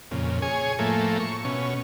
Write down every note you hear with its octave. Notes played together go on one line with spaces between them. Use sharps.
F2 A#2 C#3
G#4 C#5 G#5
A2 F3 A3 A#3
C#6
B2 C#4